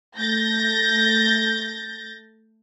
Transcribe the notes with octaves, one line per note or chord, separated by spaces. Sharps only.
A3 G6 A6 A#6